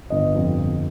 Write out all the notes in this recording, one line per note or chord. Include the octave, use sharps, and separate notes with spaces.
G1 D#5
F2
G1